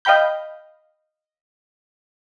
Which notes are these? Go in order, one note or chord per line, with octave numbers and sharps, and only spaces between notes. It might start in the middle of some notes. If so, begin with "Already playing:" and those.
D#5 F5 G5 B5 G6